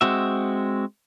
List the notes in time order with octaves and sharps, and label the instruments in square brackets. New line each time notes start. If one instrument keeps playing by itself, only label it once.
[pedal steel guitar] G#3 C4 F#4 E5